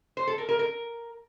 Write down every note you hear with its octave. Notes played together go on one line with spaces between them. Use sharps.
C5
A4
A#4
A#4
A#4